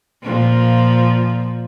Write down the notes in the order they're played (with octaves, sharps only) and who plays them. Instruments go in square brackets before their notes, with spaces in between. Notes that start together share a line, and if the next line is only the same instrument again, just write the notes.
[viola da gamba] A#2 F3